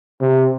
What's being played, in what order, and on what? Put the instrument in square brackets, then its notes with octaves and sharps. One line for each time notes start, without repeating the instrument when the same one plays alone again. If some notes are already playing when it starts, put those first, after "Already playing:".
[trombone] C3